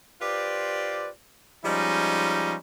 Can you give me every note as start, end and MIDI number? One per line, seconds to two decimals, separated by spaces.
0.21 1.09 65
0.21 1.09 67
0.21 1.09 71
0.21 1.09 72
0.21 1.09 74
1.64 2.55 53
1.64 2.55 55
1.64 2.55 56
1.64 2.55 61
1.64 2.55 63